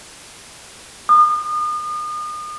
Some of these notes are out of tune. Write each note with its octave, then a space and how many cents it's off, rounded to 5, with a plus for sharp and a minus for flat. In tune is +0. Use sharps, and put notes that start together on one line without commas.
D#6 -40